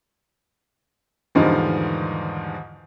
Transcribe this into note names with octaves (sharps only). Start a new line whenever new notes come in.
E2 G#2 D3 D#3 F3 G3